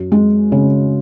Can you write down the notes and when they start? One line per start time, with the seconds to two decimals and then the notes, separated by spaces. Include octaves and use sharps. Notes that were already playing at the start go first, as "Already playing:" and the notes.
Already playing: F#2
0.12 G#3
0.52 C#3